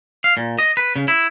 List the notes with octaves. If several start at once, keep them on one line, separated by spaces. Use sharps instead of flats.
F5
A#2
D#5
B4
C#3
E4